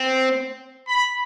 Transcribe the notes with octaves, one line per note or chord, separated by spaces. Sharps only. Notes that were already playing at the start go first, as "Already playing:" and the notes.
Already playing: C4
B5